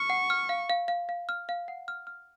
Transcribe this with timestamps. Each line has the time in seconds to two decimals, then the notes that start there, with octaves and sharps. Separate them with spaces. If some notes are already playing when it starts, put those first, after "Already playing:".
Already playing: C#6 F6
0.10 F#5
0.30 F6
0.49 F5
0.70 F5
0.88 F5
1.09 F5
1.29 F6
1.49 F5
1.68 F#5
1.88 F6
2.07 F6